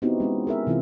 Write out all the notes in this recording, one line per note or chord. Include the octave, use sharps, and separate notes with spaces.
B3 C4 D#4 E4 F#4 G4
G#3 C4 C#4
G#4 A#4 E5
C3 E3 C4 E4 F4